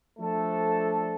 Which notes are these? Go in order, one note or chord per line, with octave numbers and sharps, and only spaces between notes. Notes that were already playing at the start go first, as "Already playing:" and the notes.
F3 A3 D4 A4